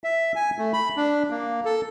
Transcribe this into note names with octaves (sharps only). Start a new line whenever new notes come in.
E5
G#5
A3
B5
D4
A#3
A4